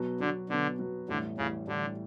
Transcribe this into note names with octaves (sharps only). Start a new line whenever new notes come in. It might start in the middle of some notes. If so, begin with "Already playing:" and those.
Already playing: B2 F#3 B3
B2 D3 F#3 B3
B2 D3 F#3 B3
B2 F#3 B3
A1 A2 D3 G3
A1 A2 C#3 G3
A1 A2 D3 G3